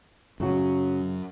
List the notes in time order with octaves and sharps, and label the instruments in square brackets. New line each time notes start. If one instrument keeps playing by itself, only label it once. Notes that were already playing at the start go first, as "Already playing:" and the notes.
[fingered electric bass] F#2 [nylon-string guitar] C#3 F#3 F#4